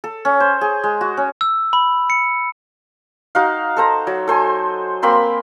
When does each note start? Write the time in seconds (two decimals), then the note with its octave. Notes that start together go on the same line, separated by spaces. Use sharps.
0.04 A4
0.25 C#4
0.40 C5
0.61 G#4
0.84 G#3
1.01 F#4
1.17 C#4
1.41 E6
1.73 B5
2.10 C#7
3.35 D#4 F#4 F5
3.77 A4 C5 A#5
4.07 F#3
4.27 A4 C5 G#5
5.02 A#3 C4 B5 C6